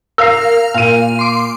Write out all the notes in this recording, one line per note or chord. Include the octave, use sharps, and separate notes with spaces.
A#4 F5 E6 C7
A#2 F5 D#7
C6 D6